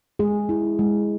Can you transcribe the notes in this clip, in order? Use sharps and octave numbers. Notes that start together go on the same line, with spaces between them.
G#3 G#4
E4
G#3